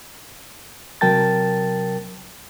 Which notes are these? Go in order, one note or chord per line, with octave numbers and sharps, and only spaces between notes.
C3 F#3 A#4 G5 A5 A6